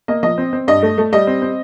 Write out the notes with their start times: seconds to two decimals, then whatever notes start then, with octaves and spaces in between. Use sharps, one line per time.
0.08 A#3 D#5
0.23 F3 D#5
0.38 C4
0.53 C4
0.68 G2 D#5
0.83 A3
0.98 A3
1.12 G3 D#5
1.27 C4
1.42 C4